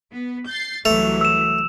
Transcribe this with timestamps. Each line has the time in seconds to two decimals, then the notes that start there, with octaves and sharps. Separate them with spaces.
0.12 B3
0.47 G6 A6 C7
0.85 C2 E3 F#3 A3 F7
1.21 E6 E7